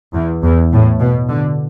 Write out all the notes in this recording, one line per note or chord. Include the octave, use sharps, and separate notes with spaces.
E2
E2
A2
B2
D3